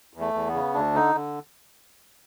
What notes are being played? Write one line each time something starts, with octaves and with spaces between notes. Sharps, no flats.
E2
A3
E2
B3
C#3
D2 D4
D3 D#4
D3